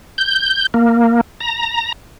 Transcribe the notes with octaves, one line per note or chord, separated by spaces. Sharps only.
G6
A#3
A#5